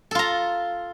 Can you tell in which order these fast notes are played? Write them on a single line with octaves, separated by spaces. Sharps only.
A4 F4 A#5